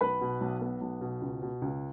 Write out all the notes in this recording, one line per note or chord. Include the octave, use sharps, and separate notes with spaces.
B1 B4 B5
B2
B1
B3
B1
B2
C#2
B2
C#2